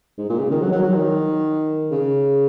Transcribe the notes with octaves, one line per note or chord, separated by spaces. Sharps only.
G#2
A#2
C#3
D#3
F#3
F#3
F#3
D#3
C#3